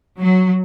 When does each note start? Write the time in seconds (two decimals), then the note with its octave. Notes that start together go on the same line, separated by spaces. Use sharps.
0.18 F#3